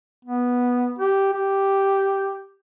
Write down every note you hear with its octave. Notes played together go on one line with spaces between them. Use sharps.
B3
G4
G4